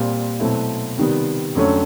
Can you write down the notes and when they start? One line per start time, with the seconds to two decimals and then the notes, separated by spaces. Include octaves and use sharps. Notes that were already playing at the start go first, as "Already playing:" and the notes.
Already playing: A#2 G3 C4
0.40 B2 F#3 A3 C4 E4
0.98 C3 D#3 G3 B3
1.55 F2 D3 F#3 A3 C#4